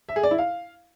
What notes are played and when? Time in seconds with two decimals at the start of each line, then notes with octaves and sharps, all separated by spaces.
0.09 E5
0.16 G#4
0.23 D5
0.31 E4
0.38 F5